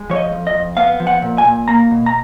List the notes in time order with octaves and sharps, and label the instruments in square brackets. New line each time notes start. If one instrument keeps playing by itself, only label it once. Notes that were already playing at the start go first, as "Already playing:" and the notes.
Already playing: [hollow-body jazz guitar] G#3
F3 C#5
D#5
F2
D#5
F2
B3 F5
F3
F#5
A#2
G#5
A#2
A#3 A#5
B2
A#5